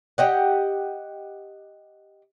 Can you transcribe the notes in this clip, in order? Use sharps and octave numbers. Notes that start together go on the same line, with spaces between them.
G4 D#5 F#5